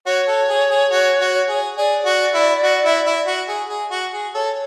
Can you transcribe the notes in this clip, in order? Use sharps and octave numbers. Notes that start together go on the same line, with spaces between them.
F#4 C#5
A4
G#4
G#4
F#4
F#4
G#4
G#4 D5
F#4
E4
F#4
E4
E4
F#4
G#4
G#4
F#4
G#4
A4 C#5